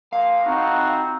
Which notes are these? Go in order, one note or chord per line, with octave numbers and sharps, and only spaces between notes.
A#2 F3 A#3 F5
A2 C4 D#4 F4 F#4